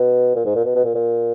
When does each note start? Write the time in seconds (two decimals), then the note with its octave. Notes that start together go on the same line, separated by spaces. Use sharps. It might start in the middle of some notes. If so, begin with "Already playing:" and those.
Already playing: B2
0.35 A#2
0.45 G#2
0.55 A#2
0.64 B2
0.75 B2
0.85 A#2
0.95 A#2